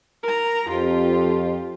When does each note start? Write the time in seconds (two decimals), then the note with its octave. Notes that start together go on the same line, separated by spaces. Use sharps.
0.23 A#4 A#5
0.69 F2 F4 G4